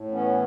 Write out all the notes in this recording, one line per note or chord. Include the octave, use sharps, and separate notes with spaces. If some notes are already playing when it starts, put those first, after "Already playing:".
Already playing: A2
E3 B3 C#4